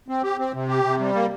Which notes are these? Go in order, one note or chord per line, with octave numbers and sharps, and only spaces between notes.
C4
G4
C4
C3
G4
C3
G3
A#3